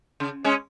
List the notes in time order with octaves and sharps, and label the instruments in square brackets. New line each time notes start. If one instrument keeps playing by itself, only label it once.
[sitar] C#3
G#3 C#4